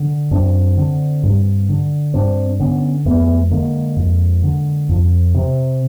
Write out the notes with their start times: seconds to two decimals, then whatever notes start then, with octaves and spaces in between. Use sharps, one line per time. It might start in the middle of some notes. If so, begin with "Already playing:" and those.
Already playing: D3
0.31 F#2 C4 D4
0.77 D3
1.23 G2
1.69 D3
2.14 G2 C4 D4
2.60 D3 B3 C#4
3.05 F2 A3 B3
3.51 D3 G#3 A#3
3.96 F2
4.43 D3
4.89 F2
5.34 C3